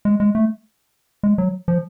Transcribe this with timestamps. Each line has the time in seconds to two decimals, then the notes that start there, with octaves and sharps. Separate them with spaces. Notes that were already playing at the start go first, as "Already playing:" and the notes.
0.05 G#3
0.20 G#3
0.35 A3
1.23 G#3
1.38 F#3
1.68 F3